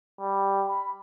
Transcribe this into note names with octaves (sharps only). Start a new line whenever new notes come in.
G3
B5